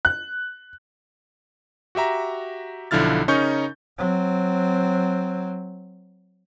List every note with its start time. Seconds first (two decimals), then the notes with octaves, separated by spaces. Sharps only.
0.05 F#6
1.95 F#4 G4 E5 A#5
2.91 B1 D3 F3 E4 F6 A6
3.28 C#3 C#4 D#4 A#4 C#6 G6
3.97 F#3 C4